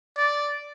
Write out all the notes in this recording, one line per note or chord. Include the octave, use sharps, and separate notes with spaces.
D5